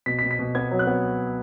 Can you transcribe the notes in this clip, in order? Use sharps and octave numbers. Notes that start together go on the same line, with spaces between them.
B2 B6
B6
B2
B6
B2
B3 G#6
F#3
F#6
B3